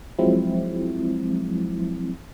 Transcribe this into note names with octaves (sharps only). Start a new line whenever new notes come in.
F3 F#3 G#3 C4 E4